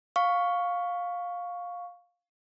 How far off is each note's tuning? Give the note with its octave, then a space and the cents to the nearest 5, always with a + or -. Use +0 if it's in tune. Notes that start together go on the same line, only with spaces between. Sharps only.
F5 +15 C#6 +5